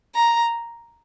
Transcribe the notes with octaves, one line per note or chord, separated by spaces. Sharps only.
A#5